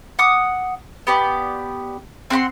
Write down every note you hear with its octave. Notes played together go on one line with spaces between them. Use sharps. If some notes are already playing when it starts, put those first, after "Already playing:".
F#5 D6 D#6
B3 G4 D5
C4 F#5 B5 C6